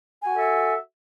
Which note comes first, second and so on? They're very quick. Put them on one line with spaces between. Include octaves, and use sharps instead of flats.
G#5 F#4 A4 E5